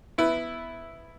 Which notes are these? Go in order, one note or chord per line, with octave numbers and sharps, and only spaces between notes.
B3 E4